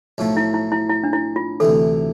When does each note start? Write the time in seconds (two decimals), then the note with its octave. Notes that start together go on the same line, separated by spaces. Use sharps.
0.18 B1 A2 F3 A3
0.37 E4
0.54 E4
0.72 E4
0.89 E4
1.04 D4
1.13 E4
1.36 F4
1.60 D2 C3 E3 A4